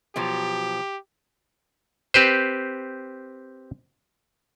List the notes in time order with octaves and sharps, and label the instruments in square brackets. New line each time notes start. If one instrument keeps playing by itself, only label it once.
[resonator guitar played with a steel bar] B2 F3 F#3 [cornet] G4
[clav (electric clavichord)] C4 G4 B4 C5